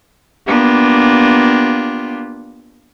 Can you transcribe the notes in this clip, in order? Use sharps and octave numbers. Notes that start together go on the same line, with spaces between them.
A#3 B3 D4 F4 G4